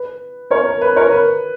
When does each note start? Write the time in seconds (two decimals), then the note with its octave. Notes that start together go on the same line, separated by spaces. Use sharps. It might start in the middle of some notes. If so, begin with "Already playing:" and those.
Already playing: B4
0.51 A#4 C#5
0.66 A#4
0.81 B4
0.96 A#4 C#5
1.12 B4